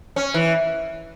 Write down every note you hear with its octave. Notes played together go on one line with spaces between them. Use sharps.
C#4
E3